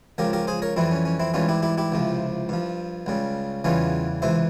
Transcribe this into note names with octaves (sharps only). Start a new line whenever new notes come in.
C#2 C#3 F3 G4 A#4
G4 A#4
G#4 C5
A#4 C#5
F2 E3 G3 C4 E4
C#4
C#4
C4 E4
G#2 E3 G3 C#4 F4
E4 G4
E4 G4
E4 G4
C#2 C3 F3
G2 F3
C#2 C#3 G3
E2 C#3 E3 G3 C#4 F4
C#2 C3 E3 C5 E5